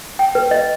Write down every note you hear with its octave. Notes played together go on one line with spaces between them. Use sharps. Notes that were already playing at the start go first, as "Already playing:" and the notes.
G5
B4
D#5